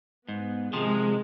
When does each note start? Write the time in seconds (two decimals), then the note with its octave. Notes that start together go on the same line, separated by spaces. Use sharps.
0.28 G#2 B3
0.73 C3 D#3 F3 G#3